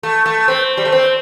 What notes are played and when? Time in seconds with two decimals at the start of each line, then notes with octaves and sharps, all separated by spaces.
0.03 A3
0.26 A3
0.48 C4
0.77 G3
0.85 A3
0.92 C4